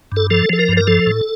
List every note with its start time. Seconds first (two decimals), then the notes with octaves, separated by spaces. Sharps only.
0.12 G2 A4
0.30 F3 A4
0.50 F3 A4
0.59 A#4
0.68 G2
0.77 A#4
0.87 F3 A4
1.06 A2